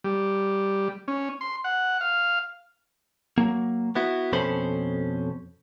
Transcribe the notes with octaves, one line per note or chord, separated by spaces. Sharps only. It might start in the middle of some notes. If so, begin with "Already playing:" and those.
G3
C#4
C6
F#5
F5
F#3 A#3
B3 E4 F#4
F2 B2 C#4 A4 C5 B5